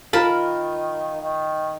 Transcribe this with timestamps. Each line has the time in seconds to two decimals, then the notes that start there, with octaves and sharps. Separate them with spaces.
0.13 D#3 F4 A#4 A5 B5
1.21 D#3